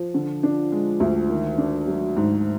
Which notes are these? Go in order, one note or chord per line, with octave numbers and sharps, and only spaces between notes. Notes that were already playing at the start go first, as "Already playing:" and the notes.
Already playing: F3
D3
D4
G#3
D2
D#3
D4
F#3
G#2